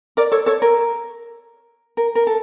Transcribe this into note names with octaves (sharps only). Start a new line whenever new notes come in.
A#4 D5
A4 C#5
A4 C#5
A#4
A#4
A#4
A4